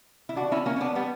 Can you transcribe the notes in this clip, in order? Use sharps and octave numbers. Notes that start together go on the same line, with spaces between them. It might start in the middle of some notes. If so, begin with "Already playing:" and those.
E4
D4 F#4
C#4 E4
A#3 C#4
C#4
B3 D4
G3 B3